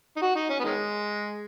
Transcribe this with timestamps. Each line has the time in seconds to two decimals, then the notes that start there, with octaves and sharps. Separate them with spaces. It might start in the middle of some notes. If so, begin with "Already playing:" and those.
0.17 D#4
0.22 F#4
0.36 D#4
0.50 C#4
0.60 B3
0.65 D#3 G#3